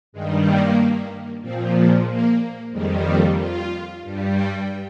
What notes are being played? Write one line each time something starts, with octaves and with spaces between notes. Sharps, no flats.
G2 D#3 G3 G#3
A#3
A#2 F3 C4
G#3
A#3
F2 D#3 G3 G#3
A#3
F4
G2 G3
G4